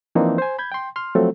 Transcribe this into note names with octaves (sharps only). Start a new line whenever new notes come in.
E3 F3 A#3 C4 D4 D#4
C5 G#5
B5 G6 G#6
G5 C6
C6 F6
F3 F#3 A3 C4 A4